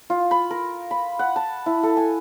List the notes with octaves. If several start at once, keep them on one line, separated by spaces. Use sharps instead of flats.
F4
B5
A#4
B5
F#5
A5
E4
A4
G#5